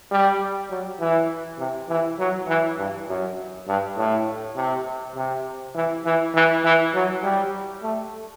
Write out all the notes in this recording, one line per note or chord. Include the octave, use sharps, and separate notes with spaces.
G3
F#3
E3
C3
E3
F#3
E3
G2
F#2
G2
A2
C3
C3
E3
E3
E3
E3
F#3
G3
A3